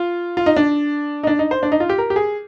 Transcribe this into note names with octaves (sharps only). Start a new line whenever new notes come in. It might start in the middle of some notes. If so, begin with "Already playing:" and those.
Already playing: F4
F4
D#4
D4
D#4
D4
D#4
C5
D4
D#4
F4
G4
A#4
G4
G#4